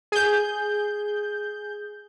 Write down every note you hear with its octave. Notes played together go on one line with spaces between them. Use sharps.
G#4 G6